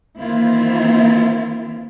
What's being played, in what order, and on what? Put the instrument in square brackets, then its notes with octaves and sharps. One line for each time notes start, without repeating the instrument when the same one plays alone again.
[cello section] D#3 E3 A#3 C4 E4 F4